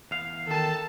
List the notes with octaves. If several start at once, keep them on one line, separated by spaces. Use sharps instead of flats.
E2 F5
D#3 A4 A5